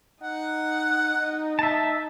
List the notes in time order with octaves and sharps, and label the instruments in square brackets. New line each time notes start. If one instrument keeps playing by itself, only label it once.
[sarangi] D#4 [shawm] F#5
[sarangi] D#4
[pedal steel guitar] E5 A5